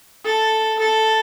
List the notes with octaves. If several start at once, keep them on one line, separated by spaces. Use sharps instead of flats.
A4
A4